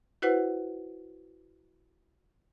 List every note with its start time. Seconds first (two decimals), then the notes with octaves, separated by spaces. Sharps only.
0.22 E4 F#4 B4 C5 F#5